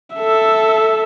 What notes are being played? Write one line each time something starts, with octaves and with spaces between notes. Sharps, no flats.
A4 E5